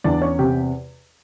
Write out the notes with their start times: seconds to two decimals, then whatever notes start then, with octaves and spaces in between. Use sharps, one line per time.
0.04 E2 D4 D5
0.21 C#4 C#5
0.39 C3 G4